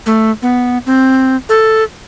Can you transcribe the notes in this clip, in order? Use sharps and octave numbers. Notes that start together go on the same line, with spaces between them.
A3
B3
C4
A4